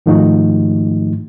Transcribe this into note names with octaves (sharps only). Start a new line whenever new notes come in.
G#2 D#3 F3 A3 D#4 F#4